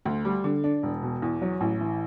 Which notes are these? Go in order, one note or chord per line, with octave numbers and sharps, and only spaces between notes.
D2
G3
D3
D4
E1
B2
E2
F#3
A1
E3